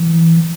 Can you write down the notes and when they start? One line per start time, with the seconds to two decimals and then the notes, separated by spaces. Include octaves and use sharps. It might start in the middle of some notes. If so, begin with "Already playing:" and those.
Already playing: E3